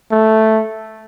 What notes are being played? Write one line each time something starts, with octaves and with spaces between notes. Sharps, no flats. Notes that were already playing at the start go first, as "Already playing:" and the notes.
A3